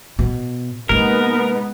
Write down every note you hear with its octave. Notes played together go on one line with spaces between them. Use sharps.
B2
C3 G#3 A#3 B3 D#4 A#4